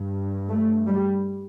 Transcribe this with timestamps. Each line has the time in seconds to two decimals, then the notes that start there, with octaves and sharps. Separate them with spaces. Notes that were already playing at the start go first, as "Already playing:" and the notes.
Already playing: G2
0.49 A3
0.87 G3